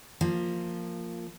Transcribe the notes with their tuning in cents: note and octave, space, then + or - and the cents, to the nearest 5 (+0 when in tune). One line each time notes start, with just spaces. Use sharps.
F3 +0 A#3 -15